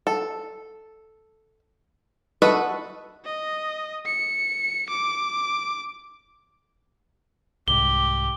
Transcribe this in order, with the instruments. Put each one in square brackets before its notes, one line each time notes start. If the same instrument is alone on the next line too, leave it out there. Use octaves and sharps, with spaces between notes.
[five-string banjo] A4
F#4 A4 B4 D#5 E5
[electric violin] D#5
C#7
D6
[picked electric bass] C2 G#2 [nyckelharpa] G4 [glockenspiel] G7